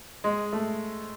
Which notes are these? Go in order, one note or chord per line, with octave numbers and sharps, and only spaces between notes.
G#3
A3